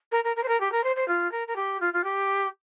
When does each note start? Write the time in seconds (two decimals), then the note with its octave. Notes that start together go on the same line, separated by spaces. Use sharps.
0.12 A#4
0.24 A#4
0.36 A#4
0.43 C5
0.48 A#4
0.60 G4
0.72 A#4
0.84 C5
0.96 C5
1.08 F4
1.32 A#4
1.48 A#4
1.56 G4
1.81 F4
1.93 F4
2.04 G4